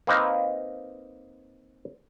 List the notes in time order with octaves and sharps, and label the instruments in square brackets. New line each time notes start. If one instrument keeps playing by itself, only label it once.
[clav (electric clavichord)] A#3 C4 D#4 B4 D#5 F5